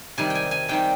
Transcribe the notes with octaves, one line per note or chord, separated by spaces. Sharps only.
C3 D#3 G3 G#5
G5
G#5
G#5
C3 D#3 G3 G5